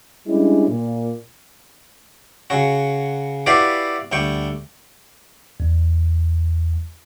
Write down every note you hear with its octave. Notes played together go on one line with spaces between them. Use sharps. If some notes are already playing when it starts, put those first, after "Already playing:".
G3 G#3 C#4 D4 E4
A#2
C#3 F#4
E4 F#4 G4 B4 D5 F5
D2 G3 G5 C#6
E2